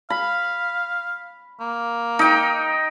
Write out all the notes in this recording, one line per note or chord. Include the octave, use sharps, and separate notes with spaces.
F5 B5
A#3
D#4 G5